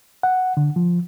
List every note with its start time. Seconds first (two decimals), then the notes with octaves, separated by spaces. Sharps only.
0.23 F#5
0.57 D3
0.76 F3